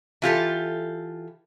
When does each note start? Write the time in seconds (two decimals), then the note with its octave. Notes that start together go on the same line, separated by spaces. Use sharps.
0.22 E3 F4 G4 A4